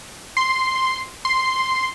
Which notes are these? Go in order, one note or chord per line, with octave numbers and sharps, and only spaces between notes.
C6
C6